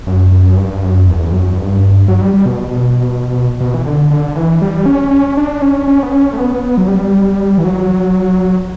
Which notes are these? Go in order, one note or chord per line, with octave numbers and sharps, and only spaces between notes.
F#2
F#2
G2
F#2
E2
F#2
G2
F#3
G3
G3
B2
B2
E3
D3
D3
E3
G3
C#4
C#4
D4
C#4
C#4
B3
C#4
A3
B3
B3
F#3
G3
E3
F#3